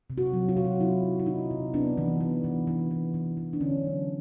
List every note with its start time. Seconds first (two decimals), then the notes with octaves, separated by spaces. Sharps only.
0.10 C3
0.18 F#4
0.33 F#3
0.49 F4
0.57 C3 F#4
0.64 F4
0.80 F#3 E4
1.03 F#3
1.20 E4
1.26 C3 D#4
1.51 C3
1.74 B3 D4
1.97 E3
2.20 B3
2.44 E3
2.67 E3
2.91 E3
3.14 E3
3.37 E3
3.53 D4
3.61 D3 C#4
3.84 F#3